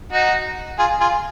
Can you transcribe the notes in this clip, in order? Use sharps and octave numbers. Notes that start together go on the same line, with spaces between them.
D#4 F#4
F4 G#4
F4 G#4